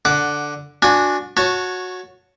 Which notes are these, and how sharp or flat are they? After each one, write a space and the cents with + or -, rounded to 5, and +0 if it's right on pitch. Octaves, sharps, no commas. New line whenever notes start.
D3 +0 F#5 +0 D6 -20
D4 +0 F#4 -25 G#5 +0
F#4 -15 C#5 +0 A5 +0